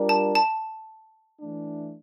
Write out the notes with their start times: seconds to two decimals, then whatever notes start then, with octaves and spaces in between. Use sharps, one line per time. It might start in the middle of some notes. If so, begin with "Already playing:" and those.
Already playing: G3 D4 F4 A#4 D5
0.09 A5
0.35 A5
1.41 E3 A3 D4